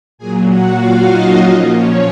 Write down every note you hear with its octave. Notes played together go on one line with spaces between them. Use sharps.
A#2 F#3 G#4 G#5
F#4 F#5
F4 F5
D#4 D#5
A#2 F3 C#4 C#5
C#4 C#5